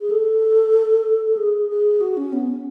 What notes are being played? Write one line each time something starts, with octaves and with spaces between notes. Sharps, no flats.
G#4
A4
G#4
G#4
F#4
C#4
B3
C#4